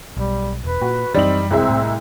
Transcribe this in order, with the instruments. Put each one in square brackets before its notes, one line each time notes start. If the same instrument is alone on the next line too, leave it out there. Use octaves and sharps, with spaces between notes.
[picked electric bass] B1 [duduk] G3
[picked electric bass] E1 [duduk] B4
[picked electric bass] A#2 [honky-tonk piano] F#4
[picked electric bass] F#2 E3 [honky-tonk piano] G3 D#4 F#7 [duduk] C4
[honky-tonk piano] C2 G#3 E5 [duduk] C4
[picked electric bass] A2